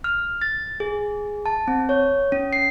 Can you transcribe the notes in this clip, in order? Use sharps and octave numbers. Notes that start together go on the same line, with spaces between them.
F6
A6
G#4
A5
C4
C#5
C#4
C7